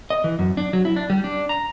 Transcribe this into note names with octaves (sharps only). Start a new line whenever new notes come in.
D#5
E3
F#2
D4
F#3
E4
D4
G3
D4
A#5